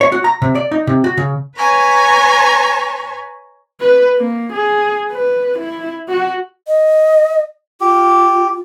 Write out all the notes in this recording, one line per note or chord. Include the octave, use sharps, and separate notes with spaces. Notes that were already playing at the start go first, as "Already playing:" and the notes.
C#5
F#4
A#5
C3
D5
D#4
C3
F#4
C#3
B4 C#5 G#5 A#5
B4
A#3
G#4
B4
E4
F#4
D#5
F4 G4